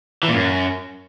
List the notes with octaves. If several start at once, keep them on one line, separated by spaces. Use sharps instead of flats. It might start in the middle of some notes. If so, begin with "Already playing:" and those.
E3
A#2
F#2